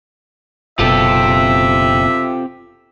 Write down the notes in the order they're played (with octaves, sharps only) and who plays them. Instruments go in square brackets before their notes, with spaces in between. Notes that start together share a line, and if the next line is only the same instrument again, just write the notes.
[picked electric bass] F#1 B2 [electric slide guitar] C4 G4 [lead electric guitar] F4 A4 [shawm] E5